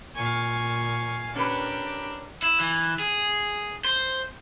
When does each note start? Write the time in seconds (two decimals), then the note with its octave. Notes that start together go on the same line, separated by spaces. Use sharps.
0.15 A#2 F5 G#5 C#6
1.36 C#4 D4 G4 A#4 B4
2.42 E4
2.60 E3
2.99 G#4
3.85 C5